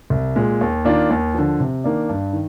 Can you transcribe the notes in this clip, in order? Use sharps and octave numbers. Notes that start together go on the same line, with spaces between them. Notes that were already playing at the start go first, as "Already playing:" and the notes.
C2
A#2 G#3
D#2
D#3 A#3 D4 F4
D#2
D3 F3
C3
D#3 A#3 D4
G2
D#3